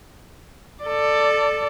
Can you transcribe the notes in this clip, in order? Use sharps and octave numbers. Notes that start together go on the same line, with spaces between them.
A4 D5